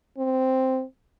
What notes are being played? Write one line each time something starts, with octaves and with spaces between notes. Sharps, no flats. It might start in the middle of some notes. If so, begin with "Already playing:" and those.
C4